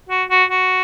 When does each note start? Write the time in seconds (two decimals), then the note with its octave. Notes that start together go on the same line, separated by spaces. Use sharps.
0.09 F#4
0.30 F#4
0.50 F#4